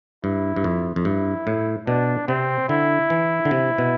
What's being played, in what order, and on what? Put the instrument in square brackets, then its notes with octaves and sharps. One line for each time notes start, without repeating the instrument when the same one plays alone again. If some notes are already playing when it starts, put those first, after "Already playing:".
[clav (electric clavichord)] G2 [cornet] E4
[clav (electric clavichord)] G2
F2
F2
[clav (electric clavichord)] G2 [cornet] E4
[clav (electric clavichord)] A2
[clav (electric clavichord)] B2 [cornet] D4
[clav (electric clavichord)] C3 [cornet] C4
[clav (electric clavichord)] D3 [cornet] E4
[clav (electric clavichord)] E3
D3
C3
B2